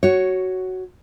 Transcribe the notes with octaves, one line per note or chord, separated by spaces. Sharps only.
F#4 C#5